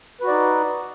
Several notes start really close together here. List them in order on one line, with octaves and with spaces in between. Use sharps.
B4 F#4 D5 D#4